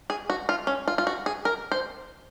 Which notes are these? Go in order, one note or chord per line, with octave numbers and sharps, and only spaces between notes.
G#4
F#4
F4
C#4
F4
F4
F#4
G#4
A#4
C5